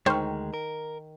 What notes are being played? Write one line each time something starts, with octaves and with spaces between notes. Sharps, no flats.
D2 D#3 G#3 C5 G5 C#6 F6
A#4